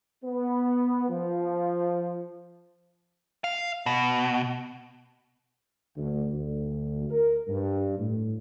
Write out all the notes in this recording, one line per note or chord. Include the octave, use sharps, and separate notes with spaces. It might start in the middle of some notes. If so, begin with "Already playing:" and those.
B3
F3
F5
B2
D2
D2
A#4
G2
A2